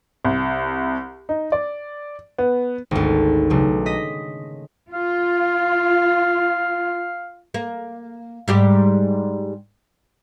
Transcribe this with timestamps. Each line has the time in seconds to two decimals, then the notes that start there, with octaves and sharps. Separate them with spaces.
0.25 C2
1.29 D#4
1.52 D5
2.38 B3
2.91 G#1 D2
3.50 B1 C#3 A3
3.86 D#5 A#6 B6
4.93 F4 F5
7.54 A#3
8.48 G#2 G3 G4